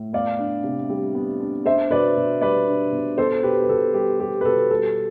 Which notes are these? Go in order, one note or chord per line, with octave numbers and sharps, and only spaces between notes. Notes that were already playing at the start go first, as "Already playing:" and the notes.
Already playing: A2
B3 D5 F5
D4
C3
G3
B3
D4
D4 C5 E5
B2 B4 D5
B2
G3 B4 D5
D4
B2
B3 A4 C5
B2 G4 B4
B4
B2 A4
G3 G4
B3 G4
B4
B2 A4
G3 A4